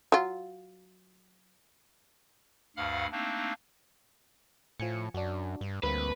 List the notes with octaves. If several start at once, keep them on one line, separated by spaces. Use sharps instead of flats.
F#3 F4
D2 G2 F5 F#5 B5 F6
A3 A#3 C4 D4 D#4
A2 F3 G#5 C#7
F#2 D4 F#4
G2
D2 G2 A#3 C4 B4